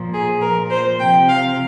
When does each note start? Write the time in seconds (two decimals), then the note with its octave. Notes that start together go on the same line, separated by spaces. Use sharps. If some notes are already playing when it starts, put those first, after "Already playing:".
Already playing: A#2 F3
0.13 G#4
0.41 A#2 F3 A#4
0.70 C5
1.00 C3 F3 G5
1.28 F5